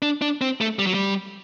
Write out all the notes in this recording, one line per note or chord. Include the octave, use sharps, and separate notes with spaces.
D4
D4
C4
A3
G3
F#3
G3